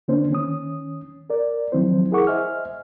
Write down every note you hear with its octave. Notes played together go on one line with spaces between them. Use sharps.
D3 A#3 C#4 D4 C5
D#3 C#4 D#6
A#4 D5
D#3 F3 F#3 C4 E4 C5
E4 G#4 A#4 F#5 C#6 D6
C5 D#5 E5 G#5 F6